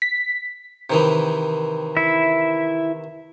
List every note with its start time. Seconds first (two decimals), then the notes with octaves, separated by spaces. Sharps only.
0.02 B6
0.90 C3 D#3 E3
1.97 E4 E5